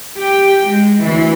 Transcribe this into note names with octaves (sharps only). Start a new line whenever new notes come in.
G4 G5
G#3
D2 E3